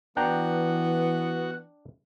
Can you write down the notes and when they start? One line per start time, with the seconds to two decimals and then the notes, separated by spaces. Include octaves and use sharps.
0.17 E3 B3 D4 F#4 G5 A#5